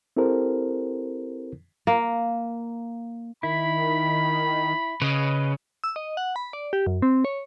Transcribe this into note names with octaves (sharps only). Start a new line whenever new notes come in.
C4 E4 G4 A4 A#4 C5
A#3
D#3 E4 B5
C#3 B4 D#5
E6
D#5
F#5
B5
D5
G4
F#2
C4
C#5